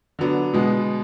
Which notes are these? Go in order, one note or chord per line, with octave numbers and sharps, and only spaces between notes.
D3 F#3 B3 D4
B2 G#3 B3